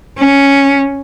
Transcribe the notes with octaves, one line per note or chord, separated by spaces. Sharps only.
C#4